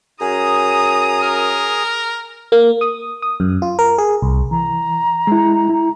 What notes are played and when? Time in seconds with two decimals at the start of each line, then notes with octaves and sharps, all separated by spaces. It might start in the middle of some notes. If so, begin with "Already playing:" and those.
0.21 F#2 G#4 A#5 D#6
1.22 A#4
2.52 A#3
2.81 D#6
3.22 D#6
3.40 F#2
3.62 F4
3.79 A#4
3.98 G#4
4.22 C2
4.51 E3 A#5
5.27 G#3 E4
5.69 E4